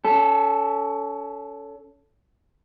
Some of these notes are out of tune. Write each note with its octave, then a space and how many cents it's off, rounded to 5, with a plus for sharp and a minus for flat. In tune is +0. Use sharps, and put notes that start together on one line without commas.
C#4 +30 A4 +0